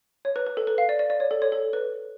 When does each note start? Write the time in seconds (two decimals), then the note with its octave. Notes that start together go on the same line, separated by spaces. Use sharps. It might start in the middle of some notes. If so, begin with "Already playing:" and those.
0.25 C#5
0.36 B4
0.47 B4
0.57 A4
0.67 B4
0.78 F5
0.89 D5
0.99 D5
1.10 D5
1.20 C#5
1.31 A4
1.42 C#5
1.52 A4
1.73 B4